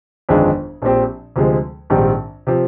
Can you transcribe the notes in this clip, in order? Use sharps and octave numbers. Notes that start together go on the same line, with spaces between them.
G1 F2 D#3 G#3 D4
A#1 A#2 F3 C4 G4
D2 C3 F3 G#3
A#1 G#2 D#3 G3 C4
C3 F3